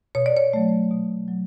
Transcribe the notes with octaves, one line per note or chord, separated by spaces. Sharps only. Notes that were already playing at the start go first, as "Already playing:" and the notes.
B2 C#5
D5
C#5
F#3 A3
B2
F#3